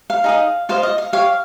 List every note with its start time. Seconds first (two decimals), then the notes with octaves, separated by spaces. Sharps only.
0.10 F5
0.24 D#4 G#4 D#5
0.69 F4 C5 D#5 F5
0.83 D#5
0.98 F5
1.13 G4 C#5 F5